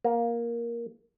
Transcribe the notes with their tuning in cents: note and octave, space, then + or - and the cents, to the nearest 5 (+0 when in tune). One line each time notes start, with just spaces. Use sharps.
A#3 +10